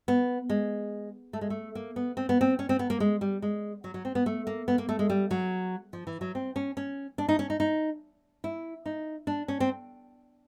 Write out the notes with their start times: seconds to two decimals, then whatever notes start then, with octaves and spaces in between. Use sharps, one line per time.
0.08 B3
0.50 G#3
1.33 A3
1.41 G#3
1.50 A3
1.75 A#3
1.96 B3
2.17 C4
2.29 B3
2.41 C4
2.59 C#4
2.69 C4
2.79 B3
2.90 A#3
3.00 G#3
3.21 G3
3.42 G#3
3.84 F#3
3.94 F#3
4.05 C4
4.15 B3
4.26 A3
4.47 A#3
4.68 B3
4.78 A#3
4.89 A3
4.99 G#3
5.10 G3
5.31 F#3
5.93 F3
6.07 E3
6.21 F#3
6.35 C4
6.56 C#4
6.77 C#4
7.18 D4
7.29 D#4
7.39 C#4
7.50 D#4
7.60 D#4
8.44 E4
8.86 D#4
9.27 D4
9.48 C#4
9.60 C4